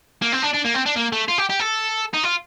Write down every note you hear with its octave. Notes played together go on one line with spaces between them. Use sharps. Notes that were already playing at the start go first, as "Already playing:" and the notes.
A#3
C4
D4
D4
A#3
C4
D4
A#3
A3
F4
G4
G4
A4
D#4
F4